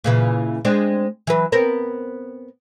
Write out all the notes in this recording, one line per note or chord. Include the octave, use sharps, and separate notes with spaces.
A#2 C#3 E3
G#3 C4 D4
E3 F#3 B4
B3 C4 A#4